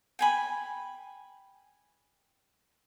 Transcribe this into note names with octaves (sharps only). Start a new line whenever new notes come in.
G5 G#5 B5